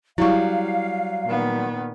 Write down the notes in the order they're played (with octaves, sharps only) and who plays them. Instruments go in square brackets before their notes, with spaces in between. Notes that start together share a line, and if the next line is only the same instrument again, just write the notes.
[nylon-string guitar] F#3 G3 [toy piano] E4 C#5 C#6 [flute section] F5
[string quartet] A#2 D#3 B3